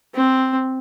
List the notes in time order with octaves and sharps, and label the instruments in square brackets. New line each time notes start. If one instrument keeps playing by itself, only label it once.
[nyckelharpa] C4